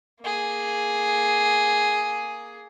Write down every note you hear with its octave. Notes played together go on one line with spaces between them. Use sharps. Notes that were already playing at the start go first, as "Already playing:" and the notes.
A#3 G#4